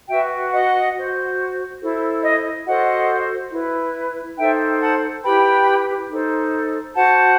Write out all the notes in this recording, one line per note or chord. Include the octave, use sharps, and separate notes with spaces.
F#4 B4 E5 G5
D#5 F#5
F#4 C5
E4 A4 C5
D#5
F#4 A4 C5 D#5 F#5
E4 B4
D#4 A4 C5 E5 G5
F#5 A5
E4 G4 B4 G5 B5
D#4 A4 C5
F#4 C5 F#5 A5